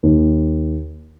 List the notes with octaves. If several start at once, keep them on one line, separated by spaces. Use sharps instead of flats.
D#2